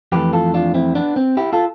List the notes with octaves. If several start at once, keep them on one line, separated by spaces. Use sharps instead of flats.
F2 E3 A3 G4 B4
F4 A4
D4 F4
C4 E4
B3 D4
C4
E4 G4
F4 A4